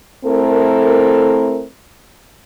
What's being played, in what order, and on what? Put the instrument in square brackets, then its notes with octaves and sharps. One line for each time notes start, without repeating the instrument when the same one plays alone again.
[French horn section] A3 C4 E4 A4 A#4